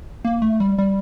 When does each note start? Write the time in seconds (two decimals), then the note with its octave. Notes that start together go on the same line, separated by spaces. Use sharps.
0.25 A#3
0.42 A3
0.60 G3
0.78 G3